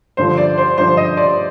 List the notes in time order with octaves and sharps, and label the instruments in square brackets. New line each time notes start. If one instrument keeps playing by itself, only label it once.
[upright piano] G2 D3 F3 C5
D5
C5
G2 D3 F3 C5
D#5
D5